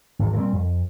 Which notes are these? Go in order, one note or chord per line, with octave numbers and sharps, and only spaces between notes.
G#1 E2
A#2 G3 B3 C4
F2